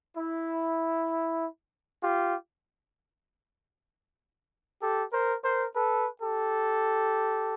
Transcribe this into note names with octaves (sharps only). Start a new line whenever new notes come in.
E4
F4 G4
G4 A4
A#4 C5
A#4 C5
A4 B4
G4 A4